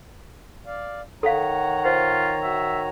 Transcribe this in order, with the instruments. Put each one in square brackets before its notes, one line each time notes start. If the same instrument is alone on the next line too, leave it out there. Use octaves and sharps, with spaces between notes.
[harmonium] D5 F5
[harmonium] D#3 C#5 A#5 [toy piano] A4 F5 [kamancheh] F#5
[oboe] F4 [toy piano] C5
[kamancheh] F#4 [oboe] E5